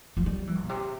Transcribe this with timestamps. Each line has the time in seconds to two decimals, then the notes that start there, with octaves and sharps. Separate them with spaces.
0.17 F3
0.26 G3
0.47 E3
0.61 A#2
0.69 C3